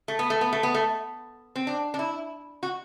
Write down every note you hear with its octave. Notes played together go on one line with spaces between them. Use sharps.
A3
B3
A3
B3
A3
B3
A3
C4
D4
D4
E4
F#4